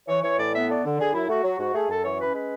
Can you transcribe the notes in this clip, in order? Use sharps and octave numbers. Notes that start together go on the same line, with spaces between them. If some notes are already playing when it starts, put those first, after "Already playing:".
E3 C#5
E3 C#5
A2 D5
B3 E5
A3 D5
D3
D3 G#4
F#2 E4
A3 F#4
F#3 F#4
G#2 F#4
A3 G#4
F#2 A4
E3 C#5
C#4 B4
G#3 B4